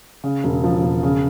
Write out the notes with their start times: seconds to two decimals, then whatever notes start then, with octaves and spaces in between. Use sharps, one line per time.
0.24 C#3
0.44 E1
0.64 F3
0.83 E1
1.03 C#3